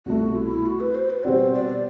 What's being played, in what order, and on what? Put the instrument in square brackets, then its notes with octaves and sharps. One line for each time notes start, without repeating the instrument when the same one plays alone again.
[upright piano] C2 B2 A3 [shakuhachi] F#4
[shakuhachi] E4
F#4
B4
C5
B4
[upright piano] B2 G3 C4 F#4 [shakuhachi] C5 D5
[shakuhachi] D5